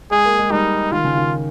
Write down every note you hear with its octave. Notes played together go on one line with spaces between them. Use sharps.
G#3 G#4
A#3
G#3
G3 D#4
D#3 F4
C#3
D#3